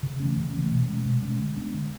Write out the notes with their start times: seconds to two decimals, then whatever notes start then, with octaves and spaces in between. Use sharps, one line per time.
0.03 C#3
0.20 E3 A3 C#4
0.37 C#3
0.54 E3 A3 C#4
0.72 B2
0.89 G#3 C#4
1.05 B2
1.22 G#3 C#4
1.39 D3
1.57 G#3 B3 D4
1.74 D3